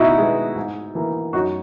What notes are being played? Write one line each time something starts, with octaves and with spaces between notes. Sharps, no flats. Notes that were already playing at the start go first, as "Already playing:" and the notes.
Already playing: B2 D#4 E4 F#4
G#3 B3
G#2
E3 A#3
F#2 D#4 F#4